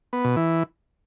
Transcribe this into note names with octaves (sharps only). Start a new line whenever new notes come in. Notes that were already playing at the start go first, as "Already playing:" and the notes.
B3
B2
E3